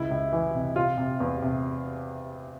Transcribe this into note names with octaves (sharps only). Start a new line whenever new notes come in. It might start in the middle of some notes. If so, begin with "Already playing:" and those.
Already playing: C#2 E4
C#2
E3
C3
C3 F4
C3
E2
C3